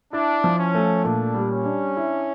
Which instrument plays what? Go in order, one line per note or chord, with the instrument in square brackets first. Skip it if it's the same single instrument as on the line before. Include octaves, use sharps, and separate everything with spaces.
[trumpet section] D4 [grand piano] E4
[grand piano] F3
[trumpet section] C#4
[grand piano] A3
[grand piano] A#2 [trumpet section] D4
[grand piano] G3
[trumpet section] C#4
[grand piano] D4
E4